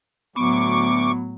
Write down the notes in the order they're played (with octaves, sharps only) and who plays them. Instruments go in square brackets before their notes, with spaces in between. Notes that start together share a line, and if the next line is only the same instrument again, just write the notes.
[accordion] D2 C#6 D6 [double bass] A2 F#3 [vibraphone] B3